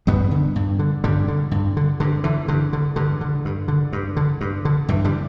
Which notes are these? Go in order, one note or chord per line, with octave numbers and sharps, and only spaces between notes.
G2 G3 B3
D3
G2
D3
G2 D3 G3
D3
G2
D3
G2 D3
D3 E3
G2 D3
D3
G2 D3
D3
G2
D3
G2
D3
G2
D3
G2 E3
D3 G3